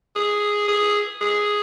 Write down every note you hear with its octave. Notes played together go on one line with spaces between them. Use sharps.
G#4
G#4
G#4